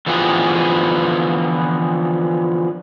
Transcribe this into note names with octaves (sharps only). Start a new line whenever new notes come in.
D3 E3 F3 B3 G4 G#4